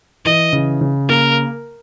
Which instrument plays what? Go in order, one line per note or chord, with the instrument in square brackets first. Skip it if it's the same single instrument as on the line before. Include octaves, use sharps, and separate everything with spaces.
[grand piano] E3 [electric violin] D#5
[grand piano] C#3
C#3
[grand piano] A#3 [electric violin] A#4